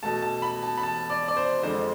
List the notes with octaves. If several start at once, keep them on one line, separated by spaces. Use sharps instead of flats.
B2 A3 A5
A5
B5
A5
B5
A5
D5
D5
C5
F2 D3 G#3 C5